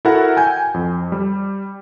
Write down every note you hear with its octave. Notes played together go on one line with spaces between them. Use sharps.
E4 F#4 A4 A#4 F#5
G5 G#5 G6
F2
G3